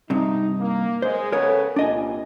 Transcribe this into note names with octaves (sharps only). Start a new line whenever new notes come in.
G2 C3 D#4
A#3
G#3 C5
C#3 B3 A4 A#4 C#5
C2 A#2 D4 D#5 G#5